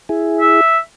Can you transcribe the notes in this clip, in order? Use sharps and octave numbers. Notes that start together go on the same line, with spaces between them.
E4 G#4
E5